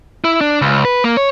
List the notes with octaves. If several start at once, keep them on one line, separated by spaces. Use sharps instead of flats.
E4
D4
C#2
B4
A#3
C#5